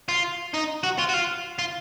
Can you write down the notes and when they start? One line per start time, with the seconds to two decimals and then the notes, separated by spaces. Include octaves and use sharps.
0.09 F4
0.54 D#4
0.84 F#4
0.99 F4
1.09 F#4
1.14 F4
1.59 F4